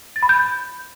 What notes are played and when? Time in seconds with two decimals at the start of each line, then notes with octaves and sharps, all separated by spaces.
0.16 A6
0.23 B5
0.29 G6